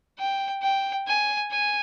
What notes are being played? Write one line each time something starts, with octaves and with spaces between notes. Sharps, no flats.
G5
G5
G#5
G#5